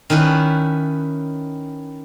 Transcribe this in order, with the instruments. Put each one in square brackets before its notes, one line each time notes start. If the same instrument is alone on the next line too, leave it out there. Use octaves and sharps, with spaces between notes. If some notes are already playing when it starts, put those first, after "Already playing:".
[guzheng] D#3 C#4 E4 B4